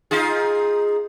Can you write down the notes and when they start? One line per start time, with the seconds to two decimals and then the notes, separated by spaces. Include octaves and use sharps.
0.11 D#4 F4 G#4